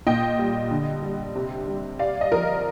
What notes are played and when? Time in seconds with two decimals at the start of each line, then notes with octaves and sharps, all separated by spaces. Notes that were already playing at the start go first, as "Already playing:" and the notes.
0.07 A#2 D#5 G5
0.39 G3
0.71 D3
1.03 G3
1.35 C3
1.68 G3
1.99 C3 D5 F5
2.21 D#5
2.32 F3 A#4 D5